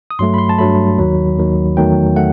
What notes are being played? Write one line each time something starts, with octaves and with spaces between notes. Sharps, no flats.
D#6
G2 F#3 A3 C6
B5
C6
A5
G2 F#3 A3 B5
D#2 D#3 F#3
D#2 D#3 F#3
E2 D#3 F#3 A3 G5
A3 F#5